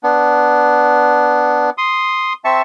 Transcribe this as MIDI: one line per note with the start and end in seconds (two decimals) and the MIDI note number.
0.03 1.70 59
0.03 1.70 62
1.78 2.33 84
1.78 2.33 87
2.45 2.62 60
2.45 2.62 76
2.45 2.62 81
2.45 2.62 85
2.45 2.62 88